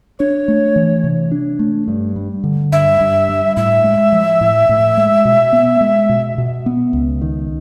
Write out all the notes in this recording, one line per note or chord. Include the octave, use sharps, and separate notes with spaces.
D4 C#5
A3
E3
C3
D4
A3
G2
G3
D3
G2 E5
G2
G3
A2 E5
G#3
F3
A2
A2
G#3
B2
B3
G#3
B2
B2
B3
C#2
D#3